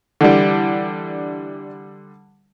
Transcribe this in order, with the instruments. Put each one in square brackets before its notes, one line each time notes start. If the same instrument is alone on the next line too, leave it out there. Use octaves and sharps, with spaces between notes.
[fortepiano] D3 G3 [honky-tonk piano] E3 D4